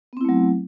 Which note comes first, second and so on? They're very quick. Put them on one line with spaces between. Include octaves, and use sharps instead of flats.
B3 C4 E4 A3 F#3